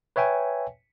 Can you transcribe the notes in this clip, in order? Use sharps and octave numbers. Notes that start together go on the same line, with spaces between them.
B4 C#5 E5 G5 G#5